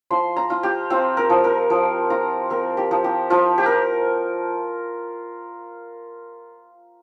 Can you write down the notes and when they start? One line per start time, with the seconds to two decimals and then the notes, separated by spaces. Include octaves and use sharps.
0.11 F3 C6
0.36 A#5
0.50 F4
0.63 G4
0.90 C4 F4
1.17 A#4
1.30 F3
1.44 A#4
1.70 F3
2.10 F4 A#5
2.50 C4 A#4
2.77 G4
2.91 F3
3.04 G4
3.30 F3 F4
3.58 G4
3.66 A#4